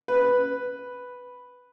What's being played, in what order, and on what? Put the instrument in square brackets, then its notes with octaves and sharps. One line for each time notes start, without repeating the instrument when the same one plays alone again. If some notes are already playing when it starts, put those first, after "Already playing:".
[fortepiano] B4